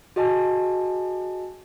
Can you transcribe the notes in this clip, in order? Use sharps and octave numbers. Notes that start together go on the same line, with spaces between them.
F#4 G#4 D#5 G#5 A5